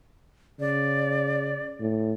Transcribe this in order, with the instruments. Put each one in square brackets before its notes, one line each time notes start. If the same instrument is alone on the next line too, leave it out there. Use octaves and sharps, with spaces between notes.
[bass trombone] C#3 [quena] D5
[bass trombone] A2